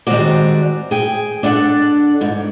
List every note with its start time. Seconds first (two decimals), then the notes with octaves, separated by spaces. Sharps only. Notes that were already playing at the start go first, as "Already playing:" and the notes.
0.07 D#3 G3 G#3 C4 F#4 D5
0.91 G#4 G5
1.43 D4 A4 D5 F#5
2.21 G#2